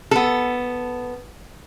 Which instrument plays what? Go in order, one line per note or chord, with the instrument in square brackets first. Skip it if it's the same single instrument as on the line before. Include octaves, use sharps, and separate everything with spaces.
[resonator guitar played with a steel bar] B3 A4